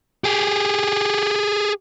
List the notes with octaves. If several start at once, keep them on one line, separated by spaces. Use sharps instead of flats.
G4 G#4